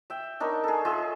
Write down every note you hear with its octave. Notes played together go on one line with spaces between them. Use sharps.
E5 G5
D4 D#4 A#4 C#5
G#4 A4
F4 G#4 D#5 E5